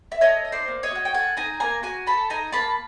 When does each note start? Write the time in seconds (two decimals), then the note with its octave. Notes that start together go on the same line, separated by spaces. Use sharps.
0.12 E5
0.21 A4 C#5 D#5
0.45 D#4
0.52 C5 D5
0.68 A#3
0.83 C#5 D#5
0.91 F#4 F#5
1.05 G5
1.14 A4 F#5 G#5
1.37 D#4 G#5 A#5
1.60 A#3 G#5 A#5
1.83 F#4 G#5 A#5
2.07 A4 A5 B5
2.30 D#4 G#5 A#5
2.52 A#3 A5 B5